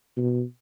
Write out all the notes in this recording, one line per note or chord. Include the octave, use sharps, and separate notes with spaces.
B2